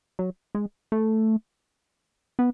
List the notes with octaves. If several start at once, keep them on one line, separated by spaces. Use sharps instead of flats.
F#3
G#3
A3
B3